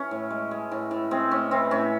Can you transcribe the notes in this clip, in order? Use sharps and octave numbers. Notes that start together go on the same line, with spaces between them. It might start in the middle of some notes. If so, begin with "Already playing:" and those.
Already playing: E3 C#4
A2
G#3
G#3
A2
A2
G#3 C4
A2 C#4
E3 C4
A2 C#4